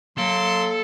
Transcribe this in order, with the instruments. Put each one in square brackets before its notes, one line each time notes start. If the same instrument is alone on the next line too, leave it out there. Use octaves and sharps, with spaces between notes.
[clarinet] F#3 [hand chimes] A#3 F5 D7 [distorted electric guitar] A4 [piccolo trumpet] C6